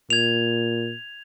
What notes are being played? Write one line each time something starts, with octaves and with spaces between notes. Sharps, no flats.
A#2 G#6 F7